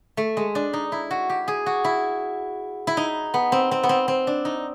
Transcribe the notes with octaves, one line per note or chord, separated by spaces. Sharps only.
A3
G#3
D4
D#4
E4
F#4
G4
G#4
F#4
E4
E4
D#4
B3
C4
C4
B3
C4
C4
D4
D#4